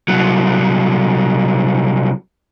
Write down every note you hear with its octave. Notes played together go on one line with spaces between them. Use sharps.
C2 F#3